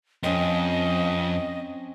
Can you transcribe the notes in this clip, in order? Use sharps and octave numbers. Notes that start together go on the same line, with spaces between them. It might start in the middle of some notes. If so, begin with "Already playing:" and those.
F2 C4 C#4 D#5